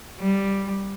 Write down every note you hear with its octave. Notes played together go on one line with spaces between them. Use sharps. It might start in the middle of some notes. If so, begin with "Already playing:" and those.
G3